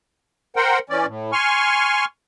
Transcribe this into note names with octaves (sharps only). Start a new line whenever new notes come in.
A#4 C5 F#5 G5
E3 C#4 D5
A2
G#5 C6 C#6 F6